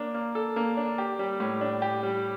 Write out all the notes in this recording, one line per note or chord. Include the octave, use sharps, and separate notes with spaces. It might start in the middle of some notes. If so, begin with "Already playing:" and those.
Already playing: A#3 D4
A#3
A4
A#3
D4
G4
G3
A2
D4
G4
G3